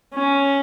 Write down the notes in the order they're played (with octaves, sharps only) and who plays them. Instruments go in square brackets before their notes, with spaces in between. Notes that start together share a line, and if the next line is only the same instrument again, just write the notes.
[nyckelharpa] C#4